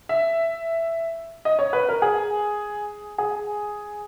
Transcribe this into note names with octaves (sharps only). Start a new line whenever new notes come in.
E5
D#5
C#5
B4
A#4
G#4
G#4